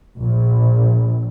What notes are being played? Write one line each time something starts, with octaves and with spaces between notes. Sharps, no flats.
A#1